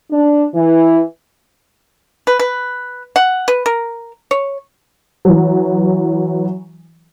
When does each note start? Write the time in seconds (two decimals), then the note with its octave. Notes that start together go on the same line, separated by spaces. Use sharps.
0.11 D4
0.54 E3
2.27 B4
2.39 B4
3.16 F#5
3.48 B4
3.66 A#4
4.31 C#5
5.25 E3 F#3